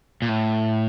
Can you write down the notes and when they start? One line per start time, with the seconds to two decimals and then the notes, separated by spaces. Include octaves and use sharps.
0.22 A#2
0.29 A2